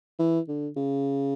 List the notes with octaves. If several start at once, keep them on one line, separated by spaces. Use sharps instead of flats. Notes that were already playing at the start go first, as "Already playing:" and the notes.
E3
D3
C#3